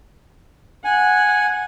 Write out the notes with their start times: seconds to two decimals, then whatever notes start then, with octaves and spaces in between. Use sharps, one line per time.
0.84 F#5 G#5